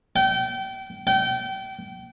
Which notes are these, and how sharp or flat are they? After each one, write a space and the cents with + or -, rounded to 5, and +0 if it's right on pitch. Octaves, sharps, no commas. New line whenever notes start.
G5 -30
G5 -30